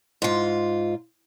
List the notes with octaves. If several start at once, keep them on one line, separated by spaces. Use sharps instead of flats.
G#2 F4